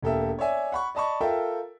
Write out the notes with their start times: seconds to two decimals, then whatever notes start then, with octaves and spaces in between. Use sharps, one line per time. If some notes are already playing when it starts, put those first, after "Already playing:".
0.02 E1 A#3 G4 A4 A#4 E5
0.39 C#5 D5 E5 G#5
0.72 F#5 B5 C#6
0.95 D5 D#5 A5 B5 C#6
1.21 F4 A4 A#4 E5 G5